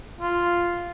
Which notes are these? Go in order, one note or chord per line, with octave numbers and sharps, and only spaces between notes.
F4